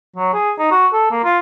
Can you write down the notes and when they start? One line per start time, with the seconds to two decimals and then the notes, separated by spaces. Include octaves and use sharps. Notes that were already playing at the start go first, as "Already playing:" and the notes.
0.16 F#3
0.33 G#4
0.59 D#4
0.71 F#4
0.93 A4
1.11 A#3
1.24 F4